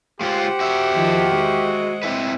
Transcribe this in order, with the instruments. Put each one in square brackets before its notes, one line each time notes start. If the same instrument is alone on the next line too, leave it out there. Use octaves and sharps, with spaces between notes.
[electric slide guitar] G#3 F4 [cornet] G4 [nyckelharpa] C5 F#5
[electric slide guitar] F#4 E5
[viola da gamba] D#3 F3
G#3
[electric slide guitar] C4 E4 B4